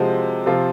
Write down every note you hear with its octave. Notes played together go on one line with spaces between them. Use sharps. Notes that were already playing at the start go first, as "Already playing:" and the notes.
Already playing: C3 F3 G#3 C4 F#4
C3 F3 C4 F4